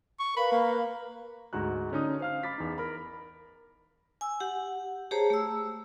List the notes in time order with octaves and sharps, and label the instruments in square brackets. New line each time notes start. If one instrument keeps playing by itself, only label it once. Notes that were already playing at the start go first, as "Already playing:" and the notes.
[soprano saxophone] C#6
[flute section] A#4 B4 F5 [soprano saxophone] B5
[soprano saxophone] A#3
[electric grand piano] D2 G#2 F#4 A#5 F#6
D3 C#4 D#4 D#6
C5 F5 F6
B5 D6 A6 B6
E2 D#4
A#4 B5
[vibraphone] G#5 E6
G4 F#5
G4 G#4 C5 C#5 A5 A#5
A3 E6